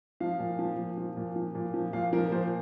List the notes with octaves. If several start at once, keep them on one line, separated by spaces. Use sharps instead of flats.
F3 F5
A#2
F3
A#2
F3
A#2
F3
A#2
F3
A#2 F5
F3 A#4
A#4
A#2 C5